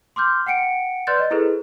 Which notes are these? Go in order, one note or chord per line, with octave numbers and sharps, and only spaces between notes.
C6 D6 F6 G6
F#5 G5 C#7 D7
B4 D5 C6 F#6 G6 A6
D#5
E4 G#4 A4 B4 C5